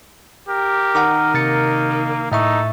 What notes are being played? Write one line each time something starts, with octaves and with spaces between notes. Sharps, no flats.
G4 A#4
D#3 F#5 A#5 D6
C3 A#3 A6 C#7
A2 D#4 A4 E5 C#6